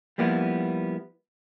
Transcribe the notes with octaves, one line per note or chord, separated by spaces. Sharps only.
F3 G3 A#3 B3 E4